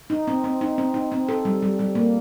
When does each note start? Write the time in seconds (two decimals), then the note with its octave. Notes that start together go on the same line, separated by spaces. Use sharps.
0.10 D#4
0.27 C4
0.44 C4
0.61 D#4
0.78 C4
0.94 D#4
1.12 C4
1.29 A4
1.45 G3
1.62 G3
1.79 G3
1.95 A#3